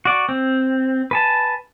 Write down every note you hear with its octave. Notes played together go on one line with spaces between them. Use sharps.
F#4 D5
C4
B4 G#5 A5